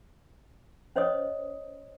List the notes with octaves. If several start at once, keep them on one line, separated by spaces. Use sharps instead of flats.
C#4 C5 C#5 D#5 D#6